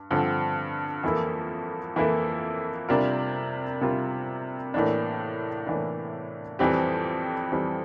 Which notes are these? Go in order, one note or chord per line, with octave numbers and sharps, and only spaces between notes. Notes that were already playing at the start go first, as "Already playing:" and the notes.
Already playing: G2
G2 D3 F3 C4
F2 E3 A#3 E4 A4
F2 E3 A#3 E4 A4
C3 G3 D4 F4 A#4
C3 G3 D4 F4 A#4
A2 E3 A#3 D4
A2 E3 A#3 D4
F2 E3 G3 C4 G4
F2 E3 G3 C4 G4